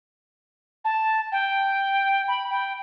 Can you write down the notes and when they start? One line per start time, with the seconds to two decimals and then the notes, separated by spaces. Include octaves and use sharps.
0.85 A5
1.32 G5
2.28 B5
2.51 G5